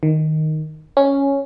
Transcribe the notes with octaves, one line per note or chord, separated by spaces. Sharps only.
D#3
C#4